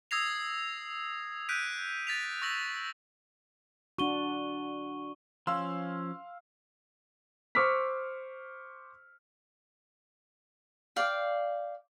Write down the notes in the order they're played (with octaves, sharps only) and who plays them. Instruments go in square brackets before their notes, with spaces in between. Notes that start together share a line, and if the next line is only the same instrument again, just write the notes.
[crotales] D#6 E6 G#6 A#6 C7 F7
F#6 G6 B6 D7 D#7
A6 B6 F7
C#6 E6 A#6 F#7
[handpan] D4 F#4 [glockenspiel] C#6 D#7 G7
[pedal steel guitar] F3 C#4 [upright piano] F5 C6 E6
[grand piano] C5 C#6 D6 E6 F6 B6
[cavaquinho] D5 F5 G5